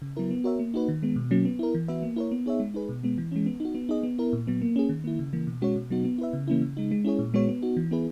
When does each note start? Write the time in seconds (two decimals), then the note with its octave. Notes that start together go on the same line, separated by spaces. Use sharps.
0.02 C#3
0.17 F#3 B3 E4 A#4
0.31 B3
0.44 F#4 A#4 C#5 E5
0.59 A#3
0.74 D#4 F#4 B4
0.88 D#3
1.03 G#3 B3
1.16 B2
1.31 F#3 A#3 C#4
1.45 B3
1.59 E4 A#4
1.75 E3
1.88 B3 F#4 B4 E5
2.03 A#3
2.16 E4 A#4 C#5
2.31 B3
2.46 D#4 G#4 C#5 E5
2.60 G#3
2.74 D#4 G#4 B4
2.89 B2
3.03 G#3 B3
3.18 E3
3.32 G#3 C#4
3.46 B3
3.60 D#4 F#4
3.75 B3
3.89 D#4 G#4 D#5
4.03 B3
4.19 E4 A#4
4.33 A#2
4.47 F#3 B3
4.62 A#3
4.76 C#4 G#4
4.89 D#3
5.04 A#3 E4
5.19 C#3
5.33 E3 A#3
5.47 B2
5.62 G#3 C#4 F#4 C#5
5.76 B2
5.90 F#3 B3 D#4 F#4
6.04 B3
6.18 E4 B4 E5
6.33 C#3
6.48 E3 A#3 C#4 E4
6.61 C#3
6.77 G#3 D#4
6.91 G#3
7.05 C#4 E4 G#4 C#5
7.19 A#2
7.34 G#3 B3 F#4 C#5
7.49 B3
7.62 D#4 F#4
7.77 E3
7.91 B3 E4 G#4 B4